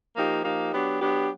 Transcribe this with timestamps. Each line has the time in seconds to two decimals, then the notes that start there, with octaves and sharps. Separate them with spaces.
0.16 F3 A#3 D#4 G4
0.44 F3 A#3 D#4 G4
0.72 F#3 B3 D4 G4
1.00 F#3 B3 D4 G4